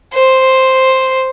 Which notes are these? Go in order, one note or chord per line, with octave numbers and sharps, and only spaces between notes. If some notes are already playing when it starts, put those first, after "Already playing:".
C5